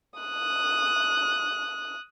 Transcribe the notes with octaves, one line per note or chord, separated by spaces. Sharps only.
D#6 F#6